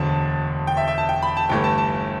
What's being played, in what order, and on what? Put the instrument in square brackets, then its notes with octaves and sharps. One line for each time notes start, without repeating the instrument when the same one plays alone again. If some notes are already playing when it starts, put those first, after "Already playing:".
Already playing: [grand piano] E1 D2 D3 A5
G5
E5
E5
A5
G5
B5
A5
G1 G2 E3 A3 G5
A5
A5